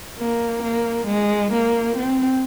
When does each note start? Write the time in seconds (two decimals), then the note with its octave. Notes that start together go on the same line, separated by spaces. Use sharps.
0.18 A#3
0.63 A#3
1.07 G#3
1.52 A#3
1.96 C4